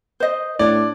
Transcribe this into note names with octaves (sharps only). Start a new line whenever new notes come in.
C5 D#5
A2 D4 C#5 D5